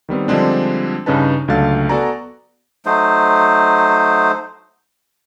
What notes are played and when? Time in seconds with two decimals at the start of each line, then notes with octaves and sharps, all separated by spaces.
0.09 D#3 G3 B3 C4
0.28 D3 F3 G3 G#3 C4 D4
1.06 G2 C#3 C#4 D#4 B4 A5
1.48 C#2 D3 F#3 A3 F5 A6
1.89 B3 F#4 A4 D5 G#5 A#5
2.86 F#3 A3 D#4 C5